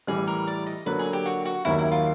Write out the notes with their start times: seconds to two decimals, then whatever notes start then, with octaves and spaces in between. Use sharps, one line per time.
0.07 A2 E3 G3 G#4
0.27 A#4
0.47 D5
0.67 D#5
0.86 D3 F#3 A#3 B4
0.99 G#4
1.13 G4
1.26 F#4
1.45 F#4
1.65 D#2 D#3 F#3 A#3 E4
1.79 E4
1.92 F4